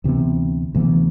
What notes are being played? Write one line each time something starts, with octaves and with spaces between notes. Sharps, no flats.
D2 C3 E3 B3
D2 C3 E3 B3